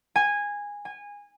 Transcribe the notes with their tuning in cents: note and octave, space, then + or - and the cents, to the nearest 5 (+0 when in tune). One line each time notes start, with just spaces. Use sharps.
G#5 -15
G#5 -20